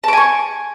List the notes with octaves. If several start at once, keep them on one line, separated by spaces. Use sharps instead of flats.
G#5 A5 C#6 D6